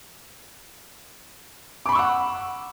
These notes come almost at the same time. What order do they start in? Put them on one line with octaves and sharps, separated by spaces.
D6 B5 C#6 E6 F#5